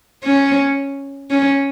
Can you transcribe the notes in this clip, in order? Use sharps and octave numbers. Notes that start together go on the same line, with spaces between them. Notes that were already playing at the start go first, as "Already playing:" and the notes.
C#4
C#4